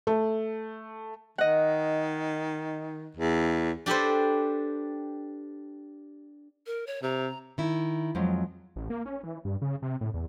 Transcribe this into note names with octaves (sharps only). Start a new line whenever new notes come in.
A3
D#3 D#5 F#5
E2
D4 G4 A4 B4 C5
A#4
C#5
C3 A#5
D#3 E4
F2 F3 F#3 G#3
A1
A#3
C#4
E3
G2
C#3
C3
A2
E2